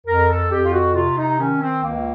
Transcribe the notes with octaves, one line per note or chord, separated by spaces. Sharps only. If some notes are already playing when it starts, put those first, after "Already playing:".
F2 A#4
A4
F2 G4
F4
F#4
C3 F4
D#4
D#3 C#4
C4
C#2 A#3